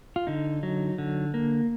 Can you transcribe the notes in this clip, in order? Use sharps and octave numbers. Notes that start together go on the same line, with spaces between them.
F4
D3 D#4
F#3
D3
A#3